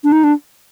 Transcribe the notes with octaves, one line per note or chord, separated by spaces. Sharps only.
D4
D#4
D4